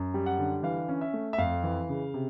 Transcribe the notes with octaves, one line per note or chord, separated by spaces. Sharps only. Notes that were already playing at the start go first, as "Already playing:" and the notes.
Already playing: F#2
G3
F#5
D3
E3 F5
C#4
E5
A3
E5
F2 F5
E3
C#3
C3